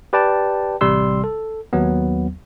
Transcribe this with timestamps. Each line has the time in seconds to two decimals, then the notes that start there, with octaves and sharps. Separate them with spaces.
0.13 G4 B4 D5 G5 A5
0.81 A1 C3 G3 C6 E6
1.24 A4
1.73 D#2 F#3 B3